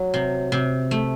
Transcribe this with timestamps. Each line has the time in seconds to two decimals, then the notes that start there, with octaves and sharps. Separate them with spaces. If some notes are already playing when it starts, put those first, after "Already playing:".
Already playing: F#3
0.14 C3
0.52 C3
0.91 A3